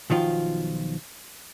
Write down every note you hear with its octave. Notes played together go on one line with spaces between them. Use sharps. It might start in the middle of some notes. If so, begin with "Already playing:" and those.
B1 D#3 F3 F4